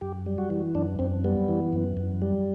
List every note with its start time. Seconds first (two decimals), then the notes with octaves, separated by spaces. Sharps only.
0.01 F#2 G4
0.26 G3
0.38 F#4
0.50 E3
0.75 F#2 D4
0.99 F#2 C4
1.24 G3 B3
1.48 E3
1.73 F#2
1.97 F#2
2.22 G3